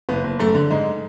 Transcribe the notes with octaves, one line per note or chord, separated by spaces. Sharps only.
F#1 B3
F#1
F#2 A3
D3
G#2 G#3